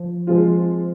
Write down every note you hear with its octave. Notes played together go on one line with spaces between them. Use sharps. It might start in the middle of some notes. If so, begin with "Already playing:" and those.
Already playing: F3
F3 G#3 C4 F4